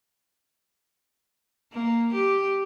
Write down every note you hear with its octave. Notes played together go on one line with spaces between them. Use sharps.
A#3
G4